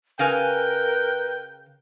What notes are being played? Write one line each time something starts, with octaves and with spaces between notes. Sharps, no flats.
C#3 A#4 B4 F5 G5 G#5